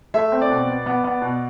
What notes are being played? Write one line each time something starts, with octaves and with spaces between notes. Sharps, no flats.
A3 E5
C4
D5
B2
B3
B3
B3
B2